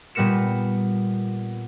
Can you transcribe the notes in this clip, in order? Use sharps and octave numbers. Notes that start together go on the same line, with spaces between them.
A#2 G3 B3 A#4 C#7 E7